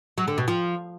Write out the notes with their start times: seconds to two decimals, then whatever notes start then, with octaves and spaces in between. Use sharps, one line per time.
0.18 F#3
0.28 D3
0.38 B2
0.48 F3